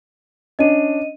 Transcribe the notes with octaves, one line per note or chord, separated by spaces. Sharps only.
C#4 D4 D#5 D#7